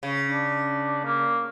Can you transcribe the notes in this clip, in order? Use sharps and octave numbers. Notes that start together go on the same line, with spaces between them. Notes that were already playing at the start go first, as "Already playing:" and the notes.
C#3
D4
A#3